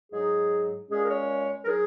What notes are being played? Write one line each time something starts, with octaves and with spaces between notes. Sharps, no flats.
G#2 F#3 D#4 G#4
A#2 G#3 C#4 G#4
A#4
C#5
A#4
F#3 D#4 G#4